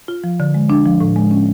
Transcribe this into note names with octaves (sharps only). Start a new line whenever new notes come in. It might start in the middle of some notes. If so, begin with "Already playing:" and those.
F4
F3
D3
G#3
D4
F3
A2
G#3
C#4